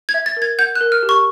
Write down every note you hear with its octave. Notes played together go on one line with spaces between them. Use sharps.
G#6
E5
A6
A#4
G#6
F#5 G6
F#6
A#4
F6
G4
C#6